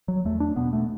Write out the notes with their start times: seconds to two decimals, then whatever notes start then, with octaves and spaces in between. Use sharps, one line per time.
0.08 F#3
0.25 E2 A3
0.40 D4
0.56 B2 B3
0.73 A3